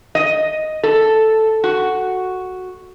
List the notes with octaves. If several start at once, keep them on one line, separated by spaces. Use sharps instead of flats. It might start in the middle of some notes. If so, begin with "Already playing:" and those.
D#5
A4
F#4